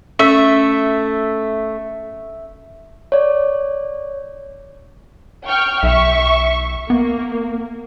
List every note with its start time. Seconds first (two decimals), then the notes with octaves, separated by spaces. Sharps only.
0.19 A3 C#4 E5
3.12 C#5 D5
5.46 G5 C#6 F6
5.83 B1 E5 C#6
6.90 A#3 B3